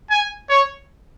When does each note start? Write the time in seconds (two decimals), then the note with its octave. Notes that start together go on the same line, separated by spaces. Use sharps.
0.10 G#5
0.49 C#5